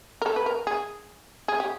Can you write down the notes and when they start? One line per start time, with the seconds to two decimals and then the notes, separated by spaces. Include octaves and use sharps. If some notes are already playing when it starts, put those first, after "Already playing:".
0.22 A#4
0.26 A4
0.36 B4
0.46 A#4
0.67 G#4
1.48 G#4
1.60 G4